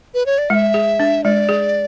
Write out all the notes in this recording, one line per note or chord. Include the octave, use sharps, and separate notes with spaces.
B4
C#5
D5
G#3 E5 F#5
G#4
D4
G#3 D5
G#4